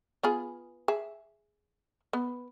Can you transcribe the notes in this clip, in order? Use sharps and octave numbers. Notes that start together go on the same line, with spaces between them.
B3 F4 G#4
G#4 E5
B3